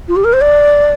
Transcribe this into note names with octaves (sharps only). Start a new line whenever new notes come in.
F4
G4
A#4
C5
D5